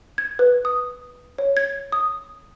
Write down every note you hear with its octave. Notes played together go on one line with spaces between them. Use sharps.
G#6
B4
D#6
C#5
G#6
D#6